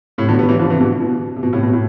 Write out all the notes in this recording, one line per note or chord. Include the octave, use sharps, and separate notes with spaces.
A2 C3
B2 D3
G3 B3
E3 G3
D3 F3
C3 E3
B2 D3
B2
C3
B2
A2 C3
B2
A2